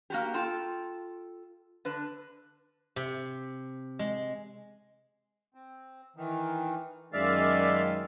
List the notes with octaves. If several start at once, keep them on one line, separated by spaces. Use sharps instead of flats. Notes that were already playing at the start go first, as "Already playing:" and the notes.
A#3 F#4 G4
F4 A4 G5
D3 B4
C3
G#3
C4
D#3 E3
F#2 D#3 G#3 D5 E5 F5